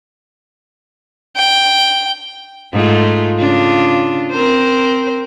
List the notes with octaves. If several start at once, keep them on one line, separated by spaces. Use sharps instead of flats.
G5
G#2 A3 F4
C#3 D4 F4
C4 A#4 C5